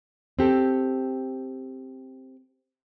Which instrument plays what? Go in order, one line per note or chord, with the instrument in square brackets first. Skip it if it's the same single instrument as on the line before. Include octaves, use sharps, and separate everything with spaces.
[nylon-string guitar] C4 G4 A4